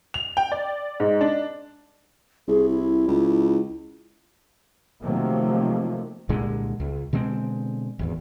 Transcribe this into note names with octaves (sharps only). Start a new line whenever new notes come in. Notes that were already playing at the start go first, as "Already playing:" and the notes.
F7
G5
D5
G#2
D4
C2 G#4
E4
C#2
C3 D#3 F3 F#3 A3 A#3
C2 A#2 D3 G#3
C#2
B2 D3 G#3 C4
G#1 E2